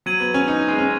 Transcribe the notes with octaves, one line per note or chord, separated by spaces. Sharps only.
F#3 G#6 D#7 F#7
B3
C#4
D#4
G#3
C#4